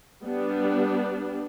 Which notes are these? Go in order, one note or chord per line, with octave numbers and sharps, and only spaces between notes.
G3 B3 D4